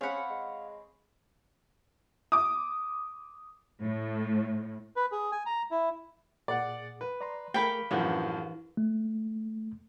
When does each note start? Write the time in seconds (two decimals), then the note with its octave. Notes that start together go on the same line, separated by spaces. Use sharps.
0.01 C4 C#4 G#4 C#5 F5 F#5 B5 F6
0.30 G#3
2.32 D6 D#6
3.83 A2
4.96 B4
5.12 G#4
5.32 G#5
5.46 A#5
5.71 E4
6.48 A#2 G#4 D5 F#5 D6
7.01 B4
7.21 D5 A#5 C6
7.54 A3 G#4 A#4 F5 G5 B5 C#6 D6
7.91 A1 F#2 E3 F3 D4 G#4 F5 F#5
8.77 A3